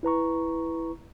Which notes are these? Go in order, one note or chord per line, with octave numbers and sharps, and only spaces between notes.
E4 B4 A#5 C#6